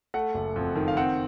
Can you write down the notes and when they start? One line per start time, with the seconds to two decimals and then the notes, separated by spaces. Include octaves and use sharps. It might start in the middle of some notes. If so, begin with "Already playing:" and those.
0.14 A3 F#5
0.34 F#1
0.56 F2
0.76 D#3
0.88 F5
0.97 C4 F#5